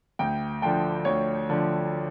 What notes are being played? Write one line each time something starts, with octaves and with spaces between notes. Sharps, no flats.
D2 G5
D3 F3 G5
D2 C#5
D3 F3